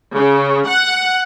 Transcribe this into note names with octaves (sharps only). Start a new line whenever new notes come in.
C#3
F#5